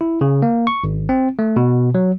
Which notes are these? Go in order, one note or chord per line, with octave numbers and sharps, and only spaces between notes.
E4
C#3
A#3
C#6
G#1
C4
A3
B2
F#3